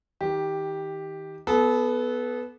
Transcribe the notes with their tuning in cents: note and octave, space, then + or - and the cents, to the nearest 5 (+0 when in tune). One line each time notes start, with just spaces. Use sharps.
D#3 +30 G4 +0
B3 +0 A4 -30